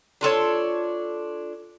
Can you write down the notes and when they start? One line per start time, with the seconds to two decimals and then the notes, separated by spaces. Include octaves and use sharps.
0.21 D4 F4 A4 C#5